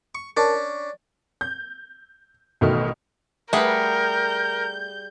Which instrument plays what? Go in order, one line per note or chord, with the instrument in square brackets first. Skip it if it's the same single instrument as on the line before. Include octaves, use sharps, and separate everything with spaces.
[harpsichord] C#6
[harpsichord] C#4 D4 [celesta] A#4 A5
[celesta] D5
[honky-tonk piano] G6
A1 B2 D#3 A3 F6
[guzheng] G3 G#4 F#5 [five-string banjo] A3 B4 [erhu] A#4 [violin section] G6